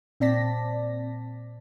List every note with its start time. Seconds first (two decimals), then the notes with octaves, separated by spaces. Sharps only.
0.20 A#2 C4 D5 A5 A#6 B6